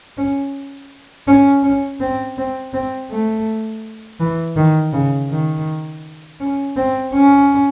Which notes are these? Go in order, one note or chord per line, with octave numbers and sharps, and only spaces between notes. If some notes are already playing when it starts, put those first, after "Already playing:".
C#4
C#4
C#4
C4
C4
C4
A3
E3
D#3
C#3
D#3
C#4
C4
C#4